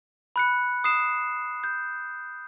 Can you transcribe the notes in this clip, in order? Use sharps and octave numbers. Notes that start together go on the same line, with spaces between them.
B5 F#6 C#7
D#6 C7 E7
G6